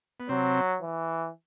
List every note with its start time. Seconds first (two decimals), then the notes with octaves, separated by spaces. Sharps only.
0.20 B3
0.29 C3 F#3 C4
0.82 E3